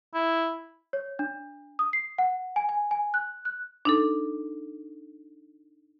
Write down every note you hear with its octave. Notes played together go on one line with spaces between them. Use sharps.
E4
C#5
D4
D#6
C7
F#5
G#5
G#5
G#5
F#6
F#6
D4 D#4 A4